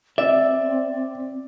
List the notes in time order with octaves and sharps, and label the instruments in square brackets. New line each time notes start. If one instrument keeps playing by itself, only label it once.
[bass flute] C4 [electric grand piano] D5 [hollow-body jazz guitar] E5